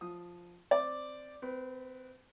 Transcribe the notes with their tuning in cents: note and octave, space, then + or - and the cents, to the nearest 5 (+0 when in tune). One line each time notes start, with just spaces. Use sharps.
F3 +0 D#6 +0
C4 +0 D5 +0
C4 -30 B4 +0